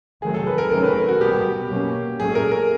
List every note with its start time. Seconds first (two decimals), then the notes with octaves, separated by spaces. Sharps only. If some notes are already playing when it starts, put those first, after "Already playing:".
0.22 C3 D#3 F#3 A3 G#4
0.34 A4
0.47 B4
0.58 A#4
0.71 C3 D#3 F#3 A3 C#4 A#4
0.84 B4
0.96 A#4
1.09 F#4
1.20 B2 G3 B3 G4
1.69 B2 F#3 A#3 C#4
2.20 A#2 F#3 A3 C#4 G#4
2.35 A#4
2.51 A#4